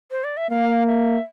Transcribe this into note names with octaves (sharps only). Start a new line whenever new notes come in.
C5
D5
E5
A#3 F5
E5